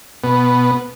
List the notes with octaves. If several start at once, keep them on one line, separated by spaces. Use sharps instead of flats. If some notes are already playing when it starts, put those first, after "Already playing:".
B2 B3